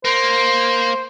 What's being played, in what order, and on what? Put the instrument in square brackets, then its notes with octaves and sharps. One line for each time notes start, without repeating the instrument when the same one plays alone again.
[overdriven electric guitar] A#3 [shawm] C5